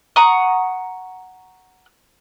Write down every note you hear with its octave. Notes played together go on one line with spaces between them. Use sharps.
F#5 A#5 C#6 D#6